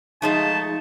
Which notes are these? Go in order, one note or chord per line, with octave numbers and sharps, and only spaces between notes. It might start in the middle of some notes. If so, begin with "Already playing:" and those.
F3 G#3 A3 D#4 A5